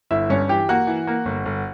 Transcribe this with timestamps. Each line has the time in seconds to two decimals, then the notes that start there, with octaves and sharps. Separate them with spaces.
0.11 G1 E4 E5
0.30 G2 C#4 C#5
0.49 E3 G4 G5
0.69 A#3 F#4 F#5
0.87 E3
1.07 A#3
1.25 G1
1.45 G1